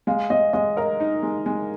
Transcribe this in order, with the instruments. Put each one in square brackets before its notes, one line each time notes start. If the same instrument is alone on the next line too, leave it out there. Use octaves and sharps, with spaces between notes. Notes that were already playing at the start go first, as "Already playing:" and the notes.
[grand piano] G#3 [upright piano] F5
[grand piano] G#3 [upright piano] D#5
[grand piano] G#3 [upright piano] D#5
[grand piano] A#4 [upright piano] D#5
[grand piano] D#4
G#3
G#3